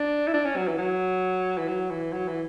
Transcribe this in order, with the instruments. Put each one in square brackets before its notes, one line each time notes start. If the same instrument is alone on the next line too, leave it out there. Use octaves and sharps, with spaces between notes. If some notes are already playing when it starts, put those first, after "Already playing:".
Already playing: [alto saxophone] D4
E4
D4
C#4
F#3
E3
F#3
E3
F#3
E3
F#3
E3